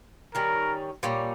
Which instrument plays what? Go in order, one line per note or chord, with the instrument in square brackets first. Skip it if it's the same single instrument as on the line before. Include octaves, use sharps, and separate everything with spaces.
[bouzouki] D#3 G3 C#4 [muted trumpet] A#4
[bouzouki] A#2 G3 C#4